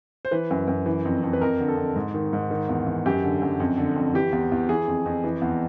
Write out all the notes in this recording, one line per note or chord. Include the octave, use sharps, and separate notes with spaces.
C5
E3 B4
F#2
F#2
E3
F2
F2
B4
F2 A#4
D3
A4
F2
G#2
D#3
G#2
D#3
E2
E2
F#2 G4
D3
F#2
F2
D3
F2
E3 G4
E2
E2
E3 G#4
F2
F2
E3
E2